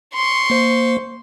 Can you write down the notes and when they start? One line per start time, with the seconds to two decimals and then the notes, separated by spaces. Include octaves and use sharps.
0.14 C6 C#6
0.50 A#3 C5